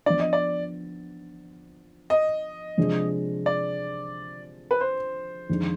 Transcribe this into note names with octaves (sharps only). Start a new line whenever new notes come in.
F3 B3 D4 D5
D#5
D5
D#5
C3 F3 G#3 D4
D5
B4
C5
F2 D#3 G#3 D4